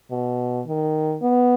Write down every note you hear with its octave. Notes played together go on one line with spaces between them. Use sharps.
B2
D#3
B3